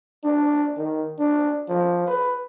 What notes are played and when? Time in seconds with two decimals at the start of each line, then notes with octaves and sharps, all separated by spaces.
0.24 D4
0.77 D#3
1.19 D4
1.68 F3
2.07 B4